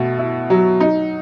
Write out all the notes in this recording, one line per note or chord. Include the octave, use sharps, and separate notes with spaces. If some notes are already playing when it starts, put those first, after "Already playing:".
Already playing: B2 A3
E4
F#3
D#4